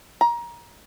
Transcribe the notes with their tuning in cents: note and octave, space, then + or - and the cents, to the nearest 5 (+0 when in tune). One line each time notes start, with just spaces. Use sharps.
A#5 +25